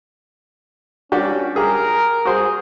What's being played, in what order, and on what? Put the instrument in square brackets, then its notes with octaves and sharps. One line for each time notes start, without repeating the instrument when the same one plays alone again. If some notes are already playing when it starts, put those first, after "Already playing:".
[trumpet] C#4 [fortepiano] D4 F#4 G4
[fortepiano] G4 G#4 [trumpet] A#4
[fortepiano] F#4 C5 [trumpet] G#4